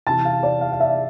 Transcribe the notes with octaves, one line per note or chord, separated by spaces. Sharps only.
C3 E3 A5
F5
D5
F5
F5
E5